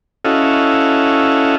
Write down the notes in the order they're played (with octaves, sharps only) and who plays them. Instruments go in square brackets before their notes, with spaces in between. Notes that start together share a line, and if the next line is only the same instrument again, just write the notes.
[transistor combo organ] C#4 E4 F#4 A4 D#5 F5